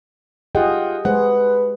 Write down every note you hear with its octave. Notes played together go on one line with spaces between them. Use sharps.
F4 G4 G#4 D#5 F#5 G5
G#3 G#4 B4 C5 F#5